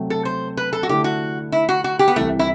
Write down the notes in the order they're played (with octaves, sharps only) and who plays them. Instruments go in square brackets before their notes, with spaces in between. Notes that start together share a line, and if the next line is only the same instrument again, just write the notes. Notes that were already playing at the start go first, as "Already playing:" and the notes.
Already playing: [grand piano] C3 F#3 A3 C4
[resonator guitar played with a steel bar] A4
C5
B4
A4
F#4
[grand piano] D3 A3 E4 A4 [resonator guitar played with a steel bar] G4
[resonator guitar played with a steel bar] F#4
E4
F#4
F#4
G4
B3
[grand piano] C2 C3 E3 [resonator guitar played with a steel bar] A3
[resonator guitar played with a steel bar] E4